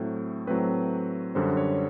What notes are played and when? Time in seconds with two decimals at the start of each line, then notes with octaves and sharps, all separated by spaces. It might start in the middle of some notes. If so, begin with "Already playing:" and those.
Already playing: A2 F#3 A3 C4
0.47 A2 F#3 A3 C4 B4
1.35 F#2 D3 G3 C5
1.57 C#5